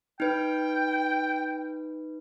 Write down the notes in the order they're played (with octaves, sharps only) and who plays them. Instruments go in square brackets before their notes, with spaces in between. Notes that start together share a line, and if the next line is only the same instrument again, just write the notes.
[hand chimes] D#4 B4 [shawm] G5